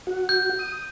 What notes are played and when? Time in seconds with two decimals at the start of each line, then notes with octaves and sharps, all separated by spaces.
0.07 F#4
0.29 G6
0.59 D#6